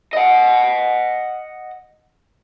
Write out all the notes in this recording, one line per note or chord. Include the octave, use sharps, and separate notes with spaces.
D#5 F#5